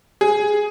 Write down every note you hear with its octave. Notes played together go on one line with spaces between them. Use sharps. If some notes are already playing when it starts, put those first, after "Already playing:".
G#4